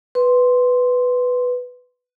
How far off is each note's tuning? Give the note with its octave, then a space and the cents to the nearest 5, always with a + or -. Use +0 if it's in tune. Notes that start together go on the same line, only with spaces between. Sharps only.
B4 +5 C6 +0